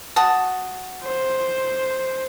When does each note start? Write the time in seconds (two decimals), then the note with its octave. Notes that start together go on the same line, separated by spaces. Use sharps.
0.16 F#4 A5 D#6
1.04 C5